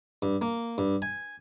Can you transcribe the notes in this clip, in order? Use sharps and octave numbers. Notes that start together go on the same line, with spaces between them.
G2
A#3
G2
G#5